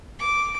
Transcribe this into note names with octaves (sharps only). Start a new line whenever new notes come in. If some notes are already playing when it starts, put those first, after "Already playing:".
D6